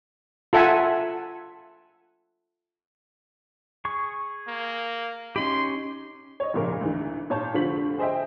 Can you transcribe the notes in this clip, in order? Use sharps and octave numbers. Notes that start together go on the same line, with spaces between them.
F4 A4 E5 F#5 G#5
G#4 C#6
A#3
C#4 D#4 G4 C6
C#5 D#5
F1 A#1 A#2 C#3 A#4
D2 E3 D#4
A#2 C#5 A5 G6
F1 D3 F3 C#6 B6 F#7
G#4 C5 D#5 E5 G5